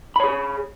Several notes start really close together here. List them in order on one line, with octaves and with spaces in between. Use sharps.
B5 C#5 G#4